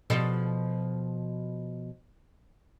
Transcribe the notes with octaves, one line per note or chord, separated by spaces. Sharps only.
B2 F3 A4